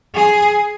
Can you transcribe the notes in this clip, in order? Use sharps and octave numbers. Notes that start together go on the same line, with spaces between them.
G#4